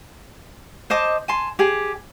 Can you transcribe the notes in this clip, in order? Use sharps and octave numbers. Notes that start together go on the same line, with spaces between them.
C5 D#5 A5 D6
G#5 A5 C6
G4 G#4